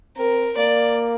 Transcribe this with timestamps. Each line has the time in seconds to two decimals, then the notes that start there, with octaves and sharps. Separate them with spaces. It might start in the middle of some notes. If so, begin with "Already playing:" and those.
0.17 C4 A#4
0.58 A#3 D5